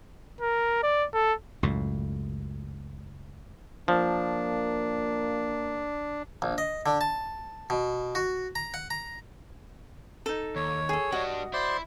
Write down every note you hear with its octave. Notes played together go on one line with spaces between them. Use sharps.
A#4
D5
A4
C#2 F#2 A2
F3 A#3 D4
A#1
D#5
D3
A5
B2
F#4
A#5
F#5
A#5
D#4 A4
D#2 C#5
G#4 A4
G3 D4 F#4 D#5
E4 C5 D5 C6